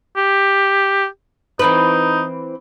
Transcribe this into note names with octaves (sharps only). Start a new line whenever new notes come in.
G4
E3 C4 D#4 B4